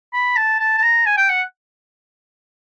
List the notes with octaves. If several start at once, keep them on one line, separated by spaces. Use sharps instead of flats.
B5
A5
A5
A5
A#5
G#5
G5
F#5